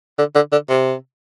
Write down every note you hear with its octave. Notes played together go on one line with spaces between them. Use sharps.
D3
D3
D3
C3